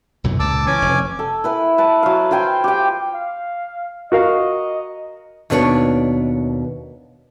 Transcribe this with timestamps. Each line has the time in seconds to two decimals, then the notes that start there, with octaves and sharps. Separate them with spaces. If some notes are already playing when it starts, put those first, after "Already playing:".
0.24 B1 F#2 A#2
0.40 C#2 A#2 A5 D6 E6
0.67 E3 C#4 G#5 D6
0.82 F1
1.19 A4
1.44 E4 B4 G#5
1.78 B4 A5
2.03 F#3 F5
2.31 F4 C5 G5 G#5
2.64 G4 G5
3.15 F5
4.12 F#4 A#4 D#5 F5
5.50 D#2 B2 B3 D4 A#4 C#5